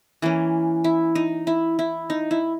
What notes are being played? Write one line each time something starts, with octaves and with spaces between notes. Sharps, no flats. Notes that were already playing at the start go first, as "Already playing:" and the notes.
E3 A#3 C#4
E4
D#4
E4
E4
D#4
E4